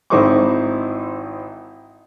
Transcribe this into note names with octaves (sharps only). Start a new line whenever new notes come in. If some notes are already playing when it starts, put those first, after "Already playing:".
G#1 D#4 E4 C5 C#6 D6